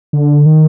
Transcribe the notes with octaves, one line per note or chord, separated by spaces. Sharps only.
D3
D#3